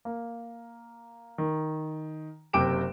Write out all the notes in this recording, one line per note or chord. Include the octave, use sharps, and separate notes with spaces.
A#3
D#3
F#1 C3 G5 D6 D7 E7